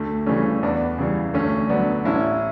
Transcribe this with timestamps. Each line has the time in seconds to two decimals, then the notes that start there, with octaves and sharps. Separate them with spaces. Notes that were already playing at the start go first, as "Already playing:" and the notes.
Already playing: D2 A3
0.26 C#3 E3 G3 A3 C#4
0.63 E2 B3 D4
0.98 C#3 E3 G3
1.34 D2 A3 C#4
1.70 D3 F#3 B3 D4
2.05 A1 C#4 E4